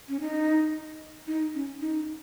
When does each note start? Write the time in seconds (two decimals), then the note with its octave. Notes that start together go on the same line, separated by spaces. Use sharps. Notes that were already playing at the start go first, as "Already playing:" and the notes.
0.09 C#4
0.20 D#4
1.27 D#4
1.55 C#4
1.81 D#4